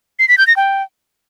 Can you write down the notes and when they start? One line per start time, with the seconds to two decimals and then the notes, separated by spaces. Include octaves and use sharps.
0.19 C7
0.29 B6
0.38 G6
0.47 A#6
0.57 G5